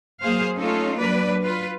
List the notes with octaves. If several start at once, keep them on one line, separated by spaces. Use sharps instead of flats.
F#3 A#3 G#4 C5 F5
A3 C#4 D#4 F4 A4
F#3 A#3 D4 B4 D5
F4 B4